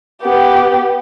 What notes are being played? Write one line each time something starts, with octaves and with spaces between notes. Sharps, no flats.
B3 G4